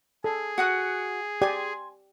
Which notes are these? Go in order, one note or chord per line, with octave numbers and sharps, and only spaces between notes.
G#4 A4
F#4 F#5 D#6
G4 D5 G5 G#5 C6